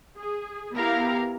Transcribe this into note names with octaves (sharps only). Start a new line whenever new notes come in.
G#4
B3 E4 G4 A#4 F5 A#5